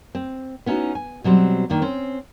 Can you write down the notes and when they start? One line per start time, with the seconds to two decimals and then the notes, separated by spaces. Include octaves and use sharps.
0.15 C4
0.66 B3 C#4 D#4 E4 F#4
0.95 G#5
1.24 B2 F#3 G3 C4
1.70 D#3 A#3 D4
1.82 C4 C#4